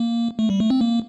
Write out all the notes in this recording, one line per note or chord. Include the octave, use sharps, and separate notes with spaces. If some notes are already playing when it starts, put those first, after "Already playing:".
Already playing: A#3
A3
G3
A3
C4
A#3